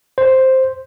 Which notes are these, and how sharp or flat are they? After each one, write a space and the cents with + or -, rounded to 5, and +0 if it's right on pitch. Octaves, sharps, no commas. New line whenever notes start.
C5 +5